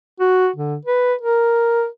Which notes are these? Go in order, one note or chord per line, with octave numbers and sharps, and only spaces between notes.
F#4
D3
B4
A#4